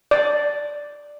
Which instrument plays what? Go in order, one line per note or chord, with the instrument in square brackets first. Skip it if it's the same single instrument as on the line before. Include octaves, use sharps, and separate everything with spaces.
[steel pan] D5